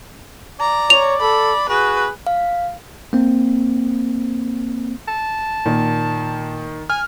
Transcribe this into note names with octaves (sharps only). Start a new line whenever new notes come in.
D5 A#5
C#5 F7
A4 B5
F#4 G#4 B4
F5
A#3 C4
A5
A#2 D#3
G#5 F6